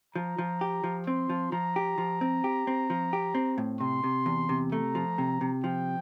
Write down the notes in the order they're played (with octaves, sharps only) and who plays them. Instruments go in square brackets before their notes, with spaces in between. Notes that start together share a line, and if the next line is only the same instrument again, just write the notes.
[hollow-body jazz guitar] F3 [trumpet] A#5
[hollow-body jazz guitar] F3
G4
F3
[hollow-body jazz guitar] C4 [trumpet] C6
[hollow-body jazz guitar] F3
[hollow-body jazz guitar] F3 [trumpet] A#5
[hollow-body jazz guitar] G4
F3
C4
G4
C4
F3
G4
C4
A2
[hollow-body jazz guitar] C3 [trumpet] C6
[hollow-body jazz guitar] C3
E2
C3
[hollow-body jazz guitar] A3 [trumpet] A#5
[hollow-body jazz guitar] F3
C3
C3
[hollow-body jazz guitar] F3 [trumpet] G5